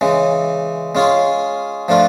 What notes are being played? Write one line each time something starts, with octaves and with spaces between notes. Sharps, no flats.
C#3 E3 G#3
G#3 C#4 F4 G#4
F3 A3 D4 F4